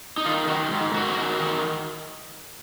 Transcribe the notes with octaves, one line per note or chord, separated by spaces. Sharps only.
D#4
D#3 F4
D#3 F#4
G#2
D#3 F#4
D#3
D#3